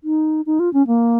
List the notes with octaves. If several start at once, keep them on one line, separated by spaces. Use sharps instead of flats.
D#4
D#4
F4
C#4
A#3